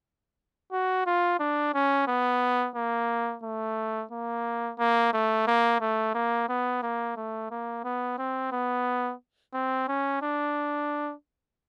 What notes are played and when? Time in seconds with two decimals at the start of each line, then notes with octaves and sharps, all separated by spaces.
0.72 F#4
1.06 F4
1.39 D4
1.74 C#4
2.08 B3
2.76 A#3
3.43 A3
4.11 A#3
4.79 A#3
5.13 A3
5.47 A#3
5.81 A3
6.15 A#3
6.49 B3
6.83 A#3
7.16 A3
7.51 A#3
7.84 B3
8.18 C4
8.52 B3
9.54 C4
9.88 C#4
10.22 D4